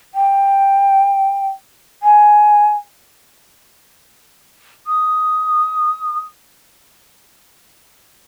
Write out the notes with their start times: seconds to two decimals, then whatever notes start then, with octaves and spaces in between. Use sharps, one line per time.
0.14 G5
2.03 G#5
4.87 D#6